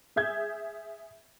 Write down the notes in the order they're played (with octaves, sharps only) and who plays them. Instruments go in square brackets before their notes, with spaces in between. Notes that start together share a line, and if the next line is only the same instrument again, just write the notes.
[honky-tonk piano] G#4 E5 G6 G#6